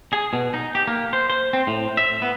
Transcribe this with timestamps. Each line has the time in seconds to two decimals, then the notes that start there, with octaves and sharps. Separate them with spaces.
0.13 G#4
0.33 B2
0.54 D#4
0.75 G4
0.87 A#3
1.13 C5
1.30 C5
1.53 C4
1.67 A2
1.97 E5
2.22 B3